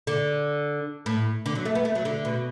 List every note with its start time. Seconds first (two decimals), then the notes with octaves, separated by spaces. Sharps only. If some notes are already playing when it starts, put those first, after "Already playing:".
0.07 D3
1.06 A2
1.46 D3
1.55 F#3
1.65 A3
1.75 B3
1.85 A3
1.95 F#3
2.05 D3
2.25 B2